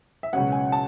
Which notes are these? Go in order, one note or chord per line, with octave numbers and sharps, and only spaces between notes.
E5
C#2 B2 F#3 C#4 F#5
G#5
A5